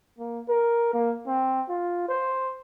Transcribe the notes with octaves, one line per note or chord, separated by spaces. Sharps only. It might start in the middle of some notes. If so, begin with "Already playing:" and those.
A#3
A#4
A#3
C4
F4
C5